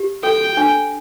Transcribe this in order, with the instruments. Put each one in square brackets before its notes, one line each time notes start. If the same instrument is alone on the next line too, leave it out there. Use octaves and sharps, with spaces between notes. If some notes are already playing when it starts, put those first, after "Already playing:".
Already playing: [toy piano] G4
[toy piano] A4 [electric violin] G5
[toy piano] D4